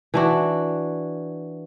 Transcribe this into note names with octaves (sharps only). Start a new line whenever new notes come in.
E3 D4 F#4